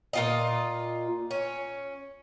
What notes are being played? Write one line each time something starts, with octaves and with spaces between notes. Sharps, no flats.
A#2 F4 D#5
C#4